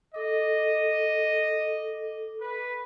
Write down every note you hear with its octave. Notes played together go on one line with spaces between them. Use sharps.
A4 D#5 D6
B4